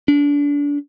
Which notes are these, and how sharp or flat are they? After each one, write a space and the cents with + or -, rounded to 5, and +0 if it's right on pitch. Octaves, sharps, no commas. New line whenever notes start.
D4 -30